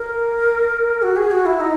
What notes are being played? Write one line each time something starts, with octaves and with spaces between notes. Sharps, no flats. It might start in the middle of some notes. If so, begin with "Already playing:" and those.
Already playing: A#4
F#4
G#4
F#4
E4
D#4